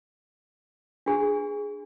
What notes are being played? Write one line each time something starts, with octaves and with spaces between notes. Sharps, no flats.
D4 G#4